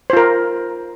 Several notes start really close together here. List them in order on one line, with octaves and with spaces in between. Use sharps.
C5 F4 A#4